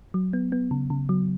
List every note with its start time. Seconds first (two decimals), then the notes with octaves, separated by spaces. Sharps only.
0.14 F#3
0.33 B3
0.52 B3
0.71 C#3
0.90 C#3
1.09 F#3